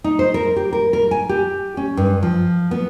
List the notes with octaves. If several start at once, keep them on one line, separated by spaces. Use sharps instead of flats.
D#4
C5
A#4
G4
A#4
A#4
G#5
G4
C#4
G2
F3
B3